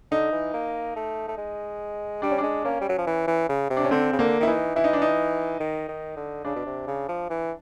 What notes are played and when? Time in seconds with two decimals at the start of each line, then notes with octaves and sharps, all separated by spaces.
0.11 D3 D#4
0.32 E3
0.53 A#3
0.96 A3
1.28 A3
1.38 G#3
2.22 G3 D4
2.31 C#4
2.38 D4
2.43 G#3
2.65 A#3 C#4
2.81 G3
2.89 F#3
2.98 F3
3.07 E3
3.27 E3
3.49 C#3
3.70 C3
3.77 D4
3.84 C#4
3.91 D3 C4
4.13 C#3
4.19 D3 A#3
4.40 D#3 E4
4.47 E3 D#4
4.76 E3 E4
4.84 D#4
4.93 D4
5.02 D#4
5.60 D#3
5.89 D#3
6.17 D3
6.45 C#3 D4
6.55 B2
6.66 C3
6.87 C#3
7.08 F3
7.30 E3